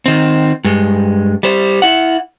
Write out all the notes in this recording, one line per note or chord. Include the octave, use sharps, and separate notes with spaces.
D#3 C4
G2 G#3
G3 C5
E4 F#5